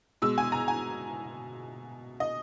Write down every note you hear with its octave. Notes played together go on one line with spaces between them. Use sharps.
B2 G#3 E6
G#5
A#5
G#5
D#5